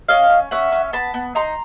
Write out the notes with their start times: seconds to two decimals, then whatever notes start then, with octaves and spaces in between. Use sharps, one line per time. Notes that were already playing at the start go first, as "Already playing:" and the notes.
0.09 C#4 D#5 F5
0.30 C#4
0.51 C#4 E5 F#5
0.72 C#4
0.93 B3 A5 B5
1.14 B3
1.35 D#4 A#5 C6